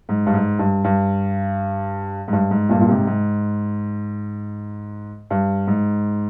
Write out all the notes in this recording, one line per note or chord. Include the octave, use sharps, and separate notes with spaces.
G#2
G2
G#2
G2
G2
G#2
G2
G#2
G2 A#2
A#2
G#2 C3
G#2
G2
G#2